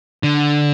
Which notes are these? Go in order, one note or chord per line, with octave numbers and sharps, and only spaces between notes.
D3